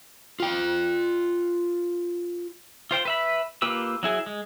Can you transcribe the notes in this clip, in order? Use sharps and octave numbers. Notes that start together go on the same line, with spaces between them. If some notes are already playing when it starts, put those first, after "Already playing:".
F4 G5
F4 C5 G5
B4 E5 B5
A#3 F4 G4 B4 E6
F#3 E4 G#4
G#3